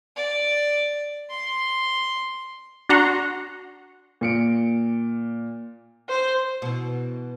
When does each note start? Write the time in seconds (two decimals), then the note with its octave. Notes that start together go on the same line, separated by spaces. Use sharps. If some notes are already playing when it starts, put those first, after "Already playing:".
0.16 D5
1.30 C6
2.89 D4 F#4 F#5 A#5 C6
4.21 A#2 C#7 D7
6.09 C5
6.62 B2 E3